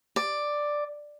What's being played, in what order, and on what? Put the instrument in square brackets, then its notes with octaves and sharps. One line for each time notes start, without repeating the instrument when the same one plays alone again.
[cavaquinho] D5